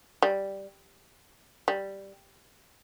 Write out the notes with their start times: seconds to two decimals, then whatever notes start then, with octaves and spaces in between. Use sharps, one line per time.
0.22 G3
1.68 G3